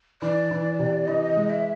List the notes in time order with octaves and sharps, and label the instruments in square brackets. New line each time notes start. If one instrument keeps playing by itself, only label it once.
[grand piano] E3 [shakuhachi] D5
[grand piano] E3
C3
[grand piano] E3 [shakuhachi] D#5
[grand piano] G#3
[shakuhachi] E5